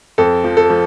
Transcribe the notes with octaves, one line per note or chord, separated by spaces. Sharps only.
F2 A4
F3
A4
F3